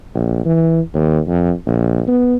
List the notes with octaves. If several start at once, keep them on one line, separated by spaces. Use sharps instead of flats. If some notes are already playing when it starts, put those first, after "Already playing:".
A#1
E3
D#2
F2
A#1
B3